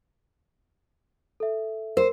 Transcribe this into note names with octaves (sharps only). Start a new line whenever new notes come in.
A4 E5
A#4 C5